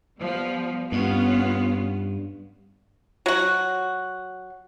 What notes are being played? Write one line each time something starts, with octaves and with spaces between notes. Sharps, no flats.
F3 G3 B3
G2 B3 C#4 F4
F#3 F#4